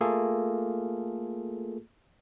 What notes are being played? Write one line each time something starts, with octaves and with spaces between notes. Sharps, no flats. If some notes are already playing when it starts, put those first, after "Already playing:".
A3 A#3 F4 G#4 A4